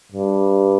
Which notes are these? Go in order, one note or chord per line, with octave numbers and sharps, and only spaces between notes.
G2